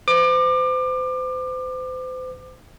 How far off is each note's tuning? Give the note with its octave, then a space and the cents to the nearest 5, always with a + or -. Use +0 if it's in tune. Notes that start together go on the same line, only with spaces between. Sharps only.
C5 -40 D6 +30